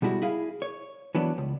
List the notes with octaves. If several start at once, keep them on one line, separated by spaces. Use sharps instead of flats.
B2 G3 G#3 E4 F#4
E4 G#4 F5
C#5
E3 F#3 B3 D4
C#2